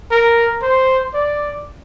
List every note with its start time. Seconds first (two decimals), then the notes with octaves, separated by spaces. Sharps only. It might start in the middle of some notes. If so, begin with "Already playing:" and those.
0.11 A#4
0.62 C5
1.14 D5